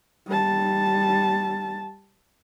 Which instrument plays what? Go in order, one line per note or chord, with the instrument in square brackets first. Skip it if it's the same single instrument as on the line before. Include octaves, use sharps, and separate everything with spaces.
[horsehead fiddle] G3 A5